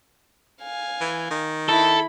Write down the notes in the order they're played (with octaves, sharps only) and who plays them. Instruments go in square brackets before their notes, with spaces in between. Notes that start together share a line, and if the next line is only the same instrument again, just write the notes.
[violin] F5 G#5
[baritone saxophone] E3
D#3
[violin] E4 B5 [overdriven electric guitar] A4